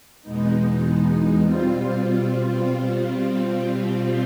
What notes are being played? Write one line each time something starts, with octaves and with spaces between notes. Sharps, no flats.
E2 B2 G#3 B3 D#4
B2 G3 C4 F4